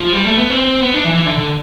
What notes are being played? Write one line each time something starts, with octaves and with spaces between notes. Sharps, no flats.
F3
G3
A3
B3
C4
B3
D4
E3
E3
D3
D3